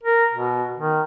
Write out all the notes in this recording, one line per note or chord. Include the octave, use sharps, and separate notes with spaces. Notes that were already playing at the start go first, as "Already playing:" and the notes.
A#4
B2
D#3